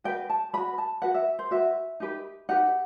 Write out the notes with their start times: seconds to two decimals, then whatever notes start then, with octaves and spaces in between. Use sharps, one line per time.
0.04 F#4 B4 G5
0.30 A5
0.53 F#4 B4 B5
0.78 A5
1.02 F#4 B4 F#5
1.14 E5
1.39 C5
1.51 F#4 B4 E5
2.00 D#4 G4 B4
2.49 D#4 G4 B4 F#5